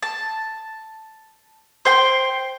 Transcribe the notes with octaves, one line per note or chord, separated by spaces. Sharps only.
A5
C5 G5 C6